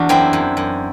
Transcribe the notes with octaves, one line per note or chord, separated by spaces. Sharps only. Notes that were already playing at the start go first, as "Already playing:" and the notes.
Already playing: E2 D4 F#4
F#2 C4 E4
F#2
F#2